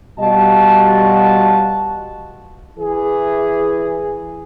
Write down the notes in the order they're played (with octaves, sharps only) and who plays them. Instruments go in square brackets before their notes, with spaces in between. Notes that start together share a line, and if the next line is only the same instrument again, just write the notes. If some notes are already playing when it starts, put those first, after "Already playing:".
[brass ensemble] B2 G3 F4 F#4 D#5 A5
[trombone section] E3 E4 G#4